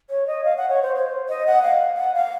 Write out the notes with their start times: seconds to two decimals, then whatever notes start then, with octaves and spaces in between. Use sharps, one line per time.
0.10 C#5
0.27 D#5
0.44 F5
0.57 F#5
0.69 C#5
0.83 C5
0.96 C5
1.29 D#5
1.47 F#5
1.63 F5
1.97 F#5
2.14 F5